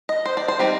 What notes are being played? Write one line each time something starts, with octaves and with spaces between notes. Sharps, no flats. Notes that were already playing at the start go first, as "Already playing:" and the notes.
D#5
C5
D5
C5
G3 C4 D#4 D5